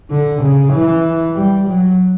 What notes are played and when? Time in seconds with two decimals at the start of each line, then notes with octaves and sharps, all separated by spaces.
0.10 D3
0.42 C#3
0.73 E3
1.36 G3
1.68 F#3